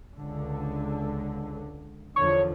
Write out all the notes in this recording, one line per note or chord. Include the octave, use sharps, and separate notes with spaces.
C#2 D3
E2 D3 F3 C#5